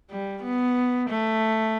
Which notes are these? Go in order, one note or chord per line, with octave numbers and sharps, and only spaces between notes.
G3
B3
A3